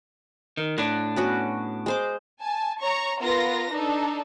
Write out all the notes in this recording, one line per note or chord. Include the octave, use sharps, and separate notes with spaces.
D#3
A2 D4 F#5
B3 C#4 F#4
G#3 C5 D6
G#5 A5
C#5 A#5 C#6
B3 F4 A#4 B4 A#6
D4 D#4 A4